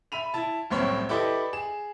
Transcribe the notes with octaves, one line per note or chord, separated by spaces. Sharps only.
E5 B5 D#7 F7
E4 A5
F1 C2 F#2 A2 C4 C#5
E4 G4 A4 B4 D5 D#5
G#4 E7